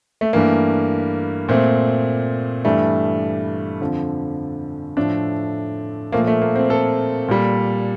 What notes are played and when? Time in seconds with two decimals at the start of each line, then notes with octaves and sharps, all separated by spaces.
0.21 A3
0.33 G2 E3 A3 A#3
1.49 A#2 A3 C4
2.64 G2 E3 G3 A3
3.81 F2 D3 F3
4.97 A2 F3 A3 D4
6.12 A#2 F3 A3 A#3
6.27 A3
6.42 A#3
6.55 C4
6.70 A4
7.28 A#2 G3